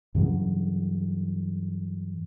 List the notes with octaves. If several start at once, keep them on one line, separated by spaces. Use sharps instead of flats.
G2 C#3 E3 F#3